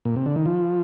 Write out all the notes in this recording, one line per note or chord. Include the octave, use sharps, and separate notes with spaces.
A#2
C3
D3
D#3
F3